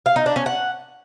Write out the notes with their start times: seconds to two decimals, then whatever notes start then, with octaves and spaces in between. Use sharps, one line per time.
0.06 F5
0.16 D#4
0.26 D4
0.36 C#4
0.46 F#5